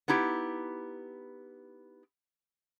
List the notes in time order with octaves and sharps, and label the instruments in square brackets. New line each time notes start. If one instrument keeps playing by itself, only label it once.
[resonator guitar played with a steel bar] B3 D#4 E4 G4